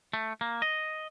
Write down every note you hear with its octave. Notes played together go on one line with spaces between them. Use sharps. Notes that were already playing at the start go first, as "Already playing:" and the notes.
A3
A#3
D#5